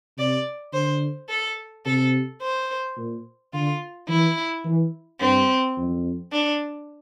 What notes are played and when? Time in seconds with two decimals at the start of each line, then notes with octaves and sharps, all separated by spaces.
0.18 C3 D5
0.73 D3 C5
1.29 A4
1.86 C3 A4
2.42 C5
2.97 A#2
3.53 D3 F4
4.08 E3 E4
4.65 E3
5.20 G2 C4
5.77 F2
6.32 D4